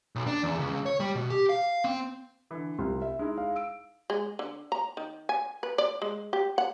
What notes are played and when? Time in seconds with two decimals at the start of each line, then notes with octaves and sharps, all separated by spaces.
0.15 B1
0.27 D4
0.43 E2
0.59 C#2
0.86 C#5
1.00 G3
1.15 B2
1.30 G4
1.49 F5
1.84 C4
2.51 D3 E3
2.79 C2 F4
3.02 E5
3.19 G#3 D#4 E4
3.38 F5
3.56 E6 D7
4.10 G#3
4.39 D3
4.72 A#5
4.97 D#3
5.29 G#5
5.63 B4
5.78 D5
6.02 G#3
6.33 G4
6.58 F#5